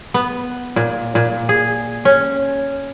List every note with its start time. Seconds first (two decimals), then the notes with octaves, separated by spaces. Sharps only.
0.14 B3
0.76 A#2
1.15 A#2
1.49 G#4
2.05 C#4